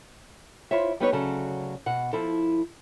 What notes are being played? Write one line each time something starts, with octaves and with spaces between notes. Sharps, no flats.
E4 F4 C5 C#5 E5
G3 B3 D#4 G4 B4 C#5
D2 C#3 F#3 A4
B2 F#5
F3 E4 A4